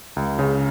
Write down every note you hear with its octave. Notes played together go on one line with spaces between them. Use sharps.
C#2
C#3